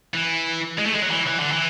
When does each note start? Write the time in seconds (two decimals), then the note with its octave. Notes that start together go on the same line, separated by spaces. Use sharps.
0.14 E3
0.79 G#3
0.86 A3
0.95 G#3
1.02 F#3
1.10 E3
1.27 E3
1.39 D3
1.52 E3